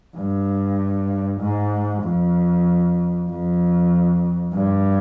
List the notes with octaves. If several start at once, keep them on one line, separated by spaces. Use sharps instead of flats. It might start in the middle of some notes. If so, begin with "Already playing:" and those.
G2
G#2
F2
F2
G2